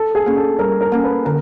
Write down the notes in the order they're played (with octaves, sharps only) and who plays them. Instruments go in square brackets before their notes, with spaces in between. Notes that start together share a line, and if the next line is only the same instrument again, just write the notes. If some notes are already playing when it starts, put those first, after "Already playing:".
Already playing: [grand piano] A4
G#4
[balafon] A#3 C#4
[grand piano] A4
[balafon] G3 [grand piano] A#4
[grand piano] A#4
[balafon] A#3 C#4
[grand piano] B4
[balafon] D3 [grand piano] A#4